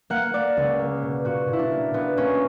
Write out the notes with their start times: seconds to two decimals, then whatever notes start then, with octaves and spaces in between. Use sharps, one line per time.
0.10 A#3 F#5
0.33 A#3 D5
0.57 C#2
0.79 A#3
1.03 B2
1.25 A#2 F#4
1.48 A#2
1.53 E4
1.59 D4
1.71 A#3
1.94 A#2 B3
2.17 A#3 C#4